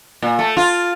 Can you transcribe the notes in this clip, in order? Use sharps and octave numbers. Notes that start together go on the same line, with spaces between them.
A#2
A3
F4